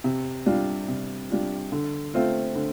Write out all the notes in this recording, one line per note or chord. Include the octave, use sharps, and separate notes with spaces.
C3
G3 D4 F4
C3
G3 D4 F4
D3
A3 C4 F4
D3